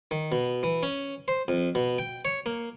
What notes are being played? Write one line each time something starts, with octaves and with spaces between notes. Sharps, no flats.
D#3
B2
E3
C#4
C5
F2
B2
G5
C#5
A#3